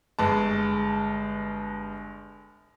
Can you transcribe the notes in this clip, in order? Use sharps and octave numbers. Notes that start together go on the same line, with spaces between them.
G1 G#3 A5